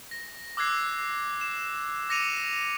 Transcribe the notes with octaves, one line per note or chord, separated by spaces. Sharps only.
A#6
D6 E6 F#6 G#6 C7
E7
D6 A#6 C#7 D#7 F7